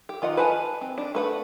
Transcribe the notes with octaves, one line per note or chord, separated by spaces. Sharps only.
G4
D#3 F4 D#5 F#5
B4 F#5 G#5 A5
C4
D4
A3 B4 F#5